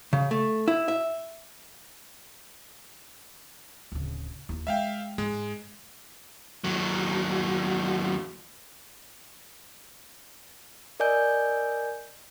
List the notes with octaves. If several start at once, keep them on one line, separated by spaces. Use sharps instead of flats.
C#3
A3
E4
E5
D1 C#3
D#2 E4
G#3 E5 F5 G5
G#2 G#3
D#2 F#3
A#4 D5 D#5 G#5 G6